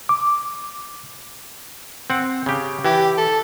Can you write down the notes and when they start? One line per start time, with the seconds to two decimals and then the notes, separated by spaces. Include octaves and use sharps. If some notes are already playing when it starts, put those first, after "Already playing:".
0.09 D6
2.10 C4 F#5
2.46 C#3 G4
2.85 E3 G4
3.17 A4